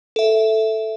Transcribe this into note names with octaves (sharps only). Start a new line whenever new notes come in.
A4 E5